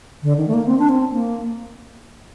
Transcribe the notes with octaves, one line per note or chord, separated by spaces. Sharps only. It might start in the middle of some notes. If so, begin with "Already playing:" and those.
D3
D#3
A3
A#3
C4
D4
C4
A#3